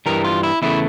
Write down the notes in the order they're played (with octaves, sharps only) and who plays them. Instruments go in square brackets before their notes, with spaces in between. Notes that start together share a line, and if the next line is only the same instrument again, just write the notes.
[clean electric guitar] G2 E3 G3 A#4
F4
E4
E2 C#3 E3 A3 E4